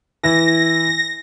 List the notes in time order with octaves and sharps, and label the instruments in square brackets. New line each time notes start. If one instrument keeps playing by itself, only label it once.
[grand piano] E3 E4 [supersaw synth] A#6